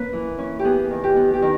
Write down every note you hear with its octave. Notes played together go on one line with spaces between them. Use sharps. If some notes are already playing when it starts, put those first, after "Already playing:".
Already playing: A#3 C#4 B4
E3
C#4
G4
B3 G#4
D#3
G4
B3
G4
D#3